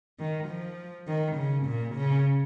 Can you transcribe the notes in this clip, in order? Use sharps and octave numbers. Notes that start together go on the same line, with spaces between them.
D#3
F3
D#3
C#3
A#2
C#3